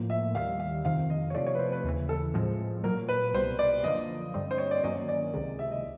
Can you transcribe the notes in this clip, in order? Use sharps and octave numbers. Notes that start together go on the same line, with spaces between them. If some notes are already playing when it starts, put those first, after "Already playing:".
Already playing: A2 F3 A#3
E5
D#2 D#3 G3 F5
F5
F2 C3 D#3 F5
D#5
C#5
C3 F3 A3 D5
C#5
B4
C5
B4
D#2 C#3 E3
A4
A2 F3 G#3 C4
A#2 F#3 A#3 A#4
B4
C2 B2 G3 C5
D5
F#2 D3 F3 A#3 D#5
G2 D3 G3 C4
C5
C#5
D5
G2 D#3 F#3 A#3 C#4 D#5
D5
C#2 C3 D#3 G#3
E5
D#5